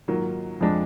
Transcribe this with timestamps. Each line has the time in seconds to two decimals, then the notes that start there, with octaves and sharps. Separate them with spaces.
0.08 G#2 D#3 F#3 A#3 F4
0.60 F2 F3 G#3 D4